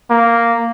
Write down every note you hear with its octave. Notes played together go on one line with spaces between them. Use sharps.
A#3